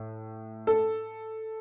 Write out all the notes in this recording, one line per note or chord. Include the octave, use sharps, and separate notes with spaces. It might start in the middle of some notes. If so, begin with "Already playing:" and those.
Already playing: A2
A4